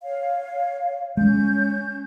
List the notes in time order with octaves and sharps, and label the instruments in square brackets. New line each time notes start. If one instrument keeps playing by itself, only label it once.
[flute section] C#5 F5
[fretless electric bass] G#3 [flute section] C#4 G6